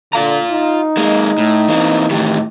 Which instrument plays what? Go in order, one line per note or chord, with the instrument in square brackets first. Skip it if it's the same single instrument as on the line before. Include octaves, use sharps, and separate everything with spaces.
[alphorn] D3 [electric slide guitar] F4 F5 A#5
[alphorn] D#4
[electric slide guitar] G#3 A#3
A2
E3 A#3 C4
[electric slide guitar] A2 D#3 E3 [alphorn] G4